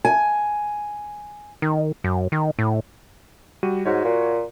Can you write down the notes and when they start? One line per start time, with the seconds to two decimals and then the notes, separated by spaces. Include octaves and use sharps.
0.05 G#5
1.62 D#3
2.04 F#2
2.32 D#3
2.59 A2
3.63 G3 F#4 D#7
3.86 G#2 F#4 C#5
4.05 A#2